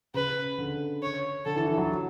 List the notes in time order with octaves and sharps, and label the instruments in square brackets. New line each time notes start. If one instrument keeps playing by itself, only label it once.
[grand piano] C#3 [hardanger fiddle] B4
[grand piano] D3
[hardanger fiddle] C#5
[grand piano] D3 [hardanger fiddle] A4
[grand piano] E3
E3
F#3